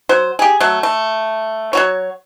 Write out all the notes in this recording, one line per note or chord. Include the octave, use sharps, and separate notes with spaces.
F#3 C5
G4 G#4
F#3 A3
A3
F#3 F#4 C#5